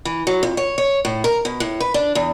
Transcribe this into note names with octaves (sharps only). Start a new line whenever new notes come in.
E3
F#3
F2
C#5
C#5
A2
A#4
B2
A2
B4
D4
E2